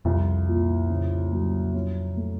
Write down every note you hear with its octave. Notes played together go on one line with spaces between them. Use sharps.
C2 F2
A#2
C#3
F#3
C#4
A3